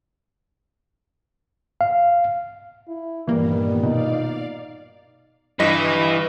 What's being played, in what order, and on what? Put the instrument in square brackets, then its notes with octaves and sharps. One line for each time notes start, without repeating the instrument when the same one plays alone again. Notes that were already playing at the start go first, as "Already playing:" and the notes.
[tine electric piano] F5
[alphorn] E4
[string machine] G2 D#3 B3 [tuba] A#2 [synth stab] E3 A#3 [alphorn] G3
[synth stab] B2 [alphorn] D#4 [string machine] D5 F5
[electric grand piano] G2 D#5 A#6 [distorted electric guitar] E3 B4